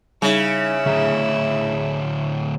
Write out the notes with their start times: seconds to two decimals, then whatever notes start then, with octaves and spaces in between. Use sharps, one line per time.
0.22 C#3 G3 D#4 E4
0.86 D2 A2 G#4 E5 A#5